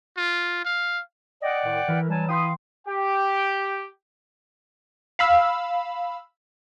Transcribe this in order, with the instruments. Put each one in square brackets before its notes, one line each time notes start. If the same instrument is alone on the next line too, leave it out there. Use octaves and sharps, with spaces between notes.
[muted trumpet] F4
F5
[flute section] D5 F#5 G5 [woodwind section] D#5
[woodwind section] A2 D#3
[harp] E3 B4 [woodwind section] E4 A#4
[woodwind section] F#3 G3 [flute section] G#5 A5
[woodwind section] E4 B5 D#6 [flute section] F5 [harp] G5 C6 G6
[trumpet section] G4 G5
[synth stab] F5 B5 E6